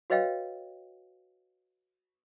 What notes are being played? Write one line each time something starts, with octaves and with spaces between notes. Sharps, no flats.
F#4 B4 C#5 D#5 F5 G5